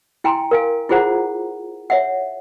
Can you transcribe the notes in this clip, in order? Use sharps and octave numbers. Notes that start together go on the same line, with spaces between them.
E4 G5 G#5 A#5 C6
A#4 F5 G#5
E4 F4 G#4 C5 F#5 A#5
C#5 E5 F#5